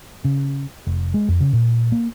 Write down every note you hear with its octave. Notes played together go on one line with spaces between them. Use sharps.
C#3
F1
G#3
F2
C#3
A#2
A#3